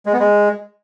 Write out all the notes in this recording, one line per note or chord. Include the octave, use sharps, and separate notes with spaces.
G#3
B3
G#3